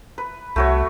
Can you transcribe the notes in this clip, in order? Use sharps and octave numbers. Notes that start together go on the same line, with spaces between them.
B4
C2 A3 F#4 C#5